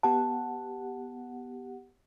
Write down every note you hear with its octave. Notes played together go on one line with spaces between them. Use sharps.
B3 G4 F#5 A5